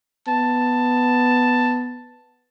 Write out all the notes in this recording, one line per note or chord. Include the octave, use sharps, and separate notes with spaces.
B3 A5